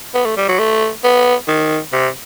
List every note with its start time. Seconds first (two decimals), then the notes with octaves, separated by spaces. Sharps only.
0.14 B3
0.25 A3
0.37 G3
0.48 F#3
0.59 A3
1.04 B3
1.48 D#3
1.92 C3